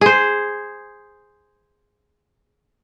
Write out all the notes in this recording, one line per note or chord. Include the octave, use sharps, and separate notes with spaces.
G#4 C5